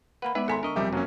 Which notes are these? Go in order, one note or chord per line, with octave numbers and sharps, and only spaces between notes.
A#3 B4 F#5 B5
G#3 B3 D#4 B4 D5 E5
G#1 A4 G#5 A#5 C6 B6 C#7
D3 A#4 D#5 C#6
F#1 F2 C3 G3 G4 E5
F#2 F#3 A#3 C#4